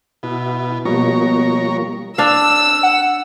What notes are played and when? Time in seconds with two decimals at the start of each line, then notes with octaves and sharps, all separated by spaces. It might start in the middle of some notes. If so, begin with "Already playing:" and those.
0.23 B2 E4 F#4
0.85 B2 F3 G3 A#3 A#4 C#5
2.18 D4 F5 E6
2.83 F#5